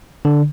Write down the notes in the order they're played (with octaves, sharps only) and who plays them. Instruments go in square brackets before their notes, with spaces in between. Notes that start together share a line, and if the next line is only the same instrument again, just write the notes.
[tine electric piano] D3